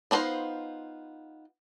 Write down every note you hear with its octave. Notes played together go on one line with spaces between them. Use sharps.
B3 D4 D#4 F4 C5